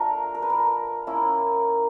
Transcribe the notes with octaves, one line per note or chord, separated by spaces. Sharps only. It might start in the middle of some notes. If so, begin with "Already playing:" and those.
Already playing: A3 D4 F4 A#4
A#4
B4
A#4
A#3 C#4 E4